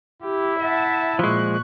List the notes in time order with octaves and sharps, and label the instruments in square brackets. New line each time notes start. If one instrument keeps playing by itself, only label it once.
[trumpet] E4 [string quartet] G4
[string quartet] E5 F#5 A5
[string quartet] A#2 C#6 F#6 [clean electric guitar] F3 G#3